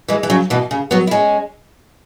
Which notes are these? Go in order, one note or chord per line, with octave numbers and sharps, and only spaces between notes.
E3 G#3
E3
C#3 F#3
B2 E3
C#3
F#3 B3
E4
G#3 C#4